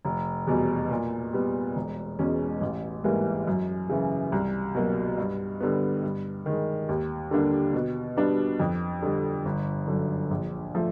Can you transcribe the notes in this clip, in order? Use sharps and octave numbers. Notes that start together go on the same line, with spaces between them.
F1
E2 B2 G3
A#2
G3 B3
E1
E2 B2 G#3 C#4
A1
G#2 E3 G3 A#3
F#2
C#3 E3
C2
B2 F#3 A#3
G2
D3 G3 B3
G2
D#3 G#3
D#2
D3 G3 A#3 D4
B2
G3 B3 D4
F2
D3 G3
G1
F#2 D3
A#1
F3 A3